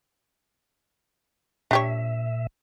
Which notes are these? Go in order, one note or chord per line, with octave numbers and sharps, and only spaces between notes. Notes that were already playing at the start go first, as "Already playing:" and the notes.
A#2 D4 G4 C#5 E5